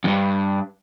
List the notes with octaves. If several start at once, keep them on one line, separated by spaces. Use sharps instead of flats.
E2 G2